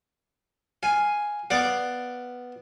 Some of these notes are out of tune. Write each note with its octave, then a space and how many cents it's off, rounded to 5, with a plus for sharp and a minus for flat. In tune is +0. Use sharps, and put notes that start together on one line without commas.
F5 +0 G#5 +0
B3 +0 D5 +0 F5 +0